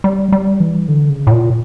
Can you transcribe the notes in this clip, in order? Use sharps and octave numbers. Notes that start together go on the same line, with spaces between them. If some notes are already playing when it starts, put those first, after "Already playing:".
G3
G3
E3
D3
C#3
A2
A#2